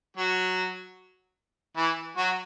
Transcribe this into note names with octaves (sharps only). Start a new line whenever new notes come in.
F#3 F#4
E3 E4
F#3 F#4